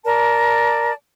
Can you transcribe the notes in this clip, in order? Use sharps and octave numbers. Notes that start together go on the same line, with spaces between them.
A#4 D5 A5